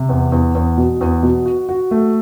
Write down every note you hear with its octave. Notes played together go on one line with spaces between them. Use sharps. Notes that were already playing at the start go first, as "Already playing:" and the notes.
Already playing: C3
E2
E2
E2
B2
E2
B2
F#4
F#4
A3